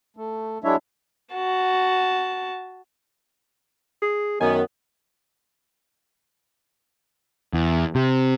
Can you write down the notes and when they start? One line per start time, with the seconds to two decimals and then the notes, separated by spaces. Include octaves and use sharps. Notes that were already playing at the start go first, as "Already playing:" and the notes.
0.17 A3
0.64 F#3 G#3 D4 E4 C#5 E5
1.34 F#4 A5
4.02 G#4
4.41 F#2 D#3 B3 G#5
7.53 E2
7.95 C3